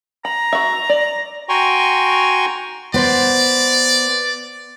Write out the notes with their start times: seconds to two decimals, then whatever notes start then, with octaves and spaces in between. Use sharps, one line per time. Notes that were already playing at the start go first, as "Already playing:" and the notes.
0.25 A#5 B5
0.53 F#4 E5
0.89 D5
1.49 F#4 G5 G#5 A#5 C6 C#6
2.94 B3 C5 D5